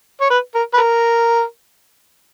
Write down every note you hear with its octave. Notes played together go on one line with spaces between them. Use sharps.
C#5
B4
A#4
B4
A#4